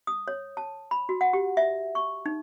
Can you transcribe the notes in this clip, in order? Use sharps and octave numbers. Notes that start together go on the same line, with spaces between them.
D#6
C#5
A5
B5
F#4
F#5
G4
E5
C#6
D#4